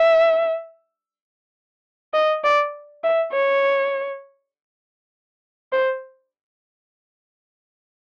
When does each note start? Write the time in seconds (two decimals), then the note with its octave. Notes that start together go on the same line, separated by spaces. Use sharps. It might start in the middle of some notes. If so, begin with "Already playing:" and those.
Already playing: E5
2.14 D#5
2.44 D5
3.04 E5
3.33 C#5
5.72 C5